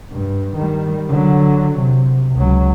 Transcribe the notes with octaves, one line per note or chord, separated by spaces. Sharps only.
G2
D#3 G3
D3 F#3
C3
C#2 F#3